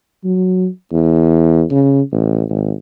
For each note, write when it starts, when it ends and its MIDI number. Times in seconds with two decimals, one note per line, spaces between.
0.24 0.68 54
0.92 1.63 40
1.71 2.01 49
2.12 2.43 33
2.49 2.72 32